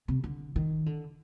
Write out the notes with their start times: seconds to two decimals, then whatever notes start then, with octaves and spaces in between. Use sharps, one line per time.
0.08 C3
0.24 D3
0.56 D#3
0.86 D3